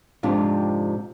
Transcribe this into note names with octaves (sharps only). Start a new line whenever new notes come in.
F2 G#2 C3 D4 F4